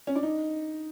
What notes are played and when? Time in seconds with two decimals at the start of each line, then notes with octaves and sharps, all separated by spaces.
0.07 C#4
0.15 D4
0.23 D#4